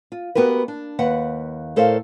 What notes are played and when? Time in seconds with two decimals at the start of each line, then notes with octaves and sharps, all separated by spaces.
0.12 F4
0.35 B3 F#4 G4 A#4 B4
0.68 D4
0.99 D#2 B4 F#5
1.76 A2 A4 A#4 C5 D5 F5